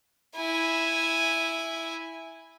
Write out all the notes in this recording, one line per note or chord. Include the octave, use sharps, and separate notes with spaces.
E4 G#5